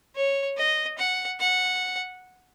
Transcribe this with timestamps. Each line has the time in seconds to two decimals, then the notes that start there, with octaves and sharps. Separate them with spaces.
0.16 C#5
0.57 D#5
0.98 F#5
1.40 F#5